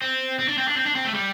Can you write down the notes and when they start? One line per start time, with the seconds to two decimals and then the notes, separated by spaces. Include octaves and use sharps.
0.02 C4
0.39 C4
0.49 D4
0.58 C4
0.68 D4
0.77 C4
0.86 D4
0.96 C4
1.05 A3
1.15 G3